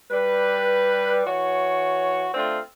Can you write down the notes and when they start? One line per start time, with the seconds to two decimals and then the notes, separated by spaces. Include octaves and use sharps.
0.10 G3 B4
1.25 E3 F#4 C#5
2.34 A3 C4 D4 F4